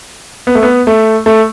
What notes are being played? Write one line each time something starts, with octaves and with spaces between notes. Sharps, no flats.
B3
A3
B3
A3
A3